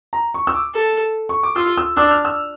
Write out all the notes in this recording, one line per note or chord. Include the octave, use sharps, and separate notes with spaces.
A#5
C#6
E6
D6
A4
C#6
D6
F4 E6
E6
D4 E6
F6
E6